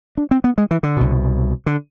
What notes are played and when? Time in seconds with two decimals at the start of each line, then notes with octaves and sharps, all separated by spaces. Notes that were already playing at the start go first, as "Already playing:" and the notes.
0.17 D4
0.31 C4
0.44 B3
0.58 G#3
0.71 E3
0.83 D3
0.97 C2 B2
1.66 D3